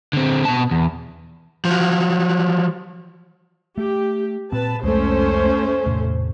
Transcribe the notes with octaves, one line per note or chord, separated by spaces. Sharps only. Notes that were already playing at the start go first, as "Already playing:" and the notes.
D3 C4
B2 A5
E2
F3 F#3
A3 G4
A#2 C4 B4 A5
C2 F2 G#3 A3 C#4 C5
E2 A2 C3